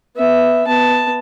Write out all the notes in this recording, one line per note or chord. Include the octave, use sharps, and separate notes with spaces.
B3 E5
B3 A5